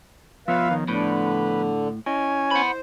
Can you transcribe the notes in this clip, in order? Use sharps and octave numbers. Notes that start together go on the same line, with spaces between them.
F3 B3 F4 B4 C#5 E5 F5
D#3
A2 D3 B4
C#4 E4 D#5 G#5
C5 F#5 B5